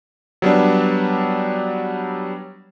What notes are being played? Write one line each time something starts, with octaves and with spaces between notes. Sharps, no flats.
F#3 G3 B3 D4